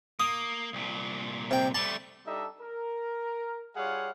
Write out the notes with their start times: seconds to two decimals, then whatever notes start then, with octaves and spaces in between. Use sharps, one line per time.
0.20 A#3 D#6
0.73 C2 A#2
1.51 C3 G5
1.75 G3 A3 A5
2.27 G3 D4 D#4 A4 D#5 E5
2.61 A#4
3.76 G3 F4 G#4 C#5 F5 F#5